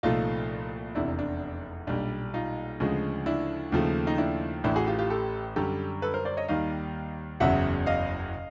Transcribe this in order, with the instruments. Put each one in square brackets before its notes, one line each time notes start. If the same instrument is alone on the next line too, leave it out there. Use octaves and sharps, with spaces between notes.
[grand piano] C2 A#2 F3 A3 D#4 F4
F1 E2 C3 D4 E4
D4
B1 A#2 G3 D4
D#4 F4
D2 C#3 F3 G#3
D4 E4
D#2 C#3 F3 A3
D#4
D4 E4
A1 A2 E3 D4 E4
F#4 G#4
F4 G4
F4 G4
G4 A4
F#2 D3 G3 G4 A4
A4 B4
A#4 C5
C5 D5
C#5 D#5
D#2 D#3 G3 D#5 F5
F#1 E2 C#3 F#3 E5 F#5
D#5 F5